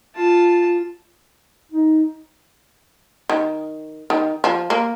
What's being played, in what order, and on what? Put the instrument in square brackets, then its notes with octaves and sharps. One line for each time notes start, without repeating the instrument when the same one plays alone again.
[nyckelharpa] F4 A5
[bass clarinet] D#4
[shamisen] D#3
D#3
F3
A#3